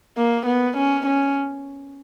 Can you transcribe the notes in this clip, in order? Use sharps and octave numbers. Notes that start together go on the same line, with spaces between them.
A#3
B3
C#4
C#4